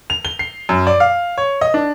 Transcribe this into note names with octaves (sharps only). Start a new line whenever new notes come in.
F7
G7
C7
F#2
D5
F5
C#5
D#5
D4